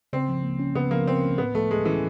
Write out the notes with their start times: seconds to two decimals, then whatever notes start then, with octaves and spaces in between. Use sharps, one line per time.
0.13 C#3 C4
0.29 F3
0.43 A#3
0.59 C#4
0.75 C#3 B3
0.91 F3 A#3
1.08 A#3 C4
1.22 C#4
1.38 A2 B3
1.55 F3 A3
1.70 G#3 A3
1.85 E3 C#4